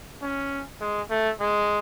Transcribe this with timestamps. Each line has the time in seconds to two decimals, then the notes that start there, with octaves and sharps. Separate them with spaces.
0.22 C#4
0.81 G#3
1.10 A3
1.40 G#3